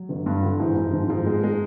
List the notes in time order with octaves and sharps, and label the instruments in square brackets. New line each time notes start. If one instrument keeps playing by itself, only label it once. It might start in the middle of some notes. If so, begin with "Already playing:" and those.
Already playing: [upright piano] F#3
[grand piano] G1
G2
D3
[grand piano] G#2 [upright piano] E3
[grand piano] G#2
[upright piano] D#3 [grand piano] F3
[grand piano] G#2
G#3
G#3